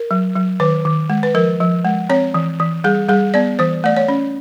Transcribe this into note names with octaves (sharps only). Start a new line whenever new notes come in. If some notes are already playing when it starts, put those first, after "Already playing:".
Already playing: A#4
F#3
F#3
D#3 B4
D#3
G#3
B4
F3 A#4
F3
G#3
C4 C#5
E3
E3
G3 G#4
G3 G#4
B3 D5
E3 C5
A3 D5
C#5
C#4